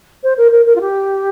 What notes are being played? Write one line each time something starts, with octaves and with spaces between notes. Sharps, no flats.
C5
A#4
A#4
A#4
F4
G4